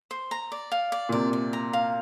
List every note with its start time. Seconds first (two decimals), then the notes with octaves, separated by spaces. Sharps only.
0.11 C5
0.31 A#5
0.52 D5
0.72 F5
0.92 D5
1.09 A#2
1.12 C3 D5
1.33 D5
1.53 A#5
1.73 F5